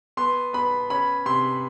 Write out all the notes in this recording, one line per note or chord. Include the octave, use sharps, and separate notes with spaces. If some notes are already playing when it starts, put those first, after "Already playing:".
B3 C6
B3 B5
C#4 B5
C3 C6